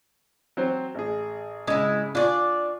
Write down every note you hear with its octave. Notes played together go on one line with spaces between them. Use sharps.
F#3 C4 C5
A1 G#4
G#1 C#3 G#3 E4 D#6
D4 F4 D5 G#5 C#6